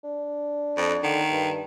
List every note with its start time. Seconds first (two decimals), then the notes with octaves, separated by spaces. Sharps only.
0.04 D4
0.77 F2
1.03 D3 D#3
1.31 G2